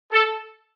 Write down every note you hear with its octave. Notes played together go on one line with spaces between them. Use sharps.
A4